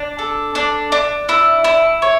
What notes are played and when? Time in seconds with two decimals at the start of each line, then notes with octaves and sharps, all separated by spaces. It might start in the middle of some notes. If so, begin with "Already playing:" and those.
Already playing: D4
0.19 A4
0.55 D4
0.92 D4
1.29 E4
1.64 E4
2.02 C#5